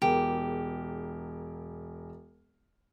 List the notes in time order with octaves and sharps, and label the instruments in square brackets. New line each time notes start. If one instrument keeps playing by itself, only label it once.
[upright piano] E1 G#4 A#4 [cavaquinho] G4